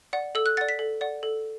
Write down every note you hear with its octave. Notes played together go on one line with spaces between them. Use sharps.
D5 F#5
A4 E6
F#6
D5 F#5 A6
B6
A4
D5 F#5
A4